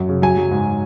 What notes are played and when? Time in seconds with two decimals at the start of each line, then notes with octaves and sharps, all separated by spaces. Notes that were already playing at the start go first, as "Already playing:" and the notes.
Already playing: F#2
0.09 C#3
0.22 F#3 G#5
0.37 F#3
0.51 G#2